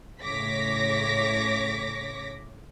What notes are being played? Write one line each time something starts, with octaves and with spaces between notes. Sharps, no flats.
A2 C#3 C#5 D6 A#6 B6